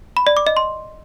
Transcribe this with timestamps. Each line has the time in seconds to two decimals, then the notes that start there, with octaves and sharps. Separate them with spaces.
0.17 B5
0.27 D5
0.37 D6
0.47 D#5
0.57 C6